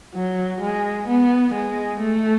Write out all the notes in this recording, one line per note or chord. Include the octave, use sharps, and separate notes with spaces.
F#3
G#3
B3
G#3
A3